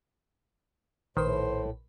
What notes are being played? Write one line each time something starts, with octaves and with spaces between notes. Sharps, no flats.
A#1 A2 D#3 B4 C5